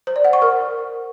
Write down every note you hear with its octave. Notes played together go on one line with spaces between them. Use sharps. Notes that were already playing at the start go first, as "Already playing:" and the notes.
C5
D5
F#5
C#6
A#4